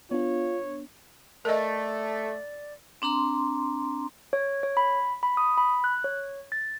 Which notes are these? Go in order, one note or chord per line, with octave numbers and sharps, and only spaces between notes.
B3 D4 F4 C#5
A3 A#4 D5 D#5
C4 D4 A#5 C6
C#5
C#5
B5
B5
D#6
B5
F#6
C#5
A6